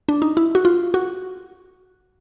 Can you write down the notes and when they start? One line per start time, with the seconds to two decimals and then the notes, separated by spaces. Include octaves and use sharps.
0.09 D4
0.22 D#4
0.37 E4
0.55 F#4
0.65 F4
0.94 F#4